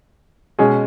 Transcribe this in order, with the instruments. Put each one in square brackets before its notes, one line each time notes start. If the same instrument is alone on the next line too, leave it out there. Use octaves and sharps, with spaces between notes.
[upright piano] B2 G#3 C#4 G#4